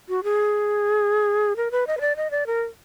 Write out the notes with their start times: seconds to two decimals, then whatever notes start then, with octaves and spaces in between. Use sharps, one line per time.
0.09 F#4
0.24 G#4
1.57 A#4
1.71 B4
1.87 D#5
1.97 B4
2.01 D5
2.16 D#5
2.31 D5
2.47 A#4